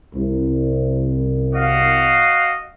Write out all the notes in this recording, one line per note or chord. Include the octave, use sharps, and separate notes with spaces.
C2
F#4 D#5 F5